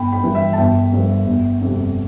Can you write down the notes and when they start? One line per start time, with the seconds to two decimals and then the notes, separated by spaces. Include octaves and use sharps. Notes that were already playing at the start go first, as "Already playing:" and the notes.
Already playing: G1 G5 B5
0.12 G5 B5
0.23 G2 E3
0.34 E5 G5
0.53 A5
0.58 G1 E5 G5
0.92 G2 F3 A3
1.26 G1
1.61 F2 C3 G3